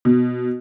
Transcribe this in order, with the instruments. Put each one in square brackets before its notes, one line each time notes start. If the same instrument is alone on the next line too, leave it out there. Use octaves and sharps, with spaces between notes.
[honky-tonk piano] B2